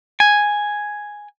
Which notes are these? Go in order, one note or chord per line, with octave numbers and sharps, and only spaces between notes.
G#5